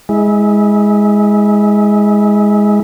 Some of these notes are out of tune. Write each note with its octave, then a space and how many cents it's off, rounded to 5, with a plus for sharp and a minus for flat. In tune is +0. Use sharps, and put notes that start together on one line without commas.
G#3 +0 E4 -25